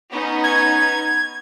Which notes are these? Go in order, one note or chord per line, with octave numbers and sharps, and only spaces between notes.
B3 C#4 D#4
G#6